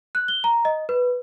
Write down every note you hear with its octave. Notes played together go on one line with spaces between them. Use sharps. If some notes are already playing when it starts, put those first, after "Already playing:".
F#6
G7
A#5
D#5
B4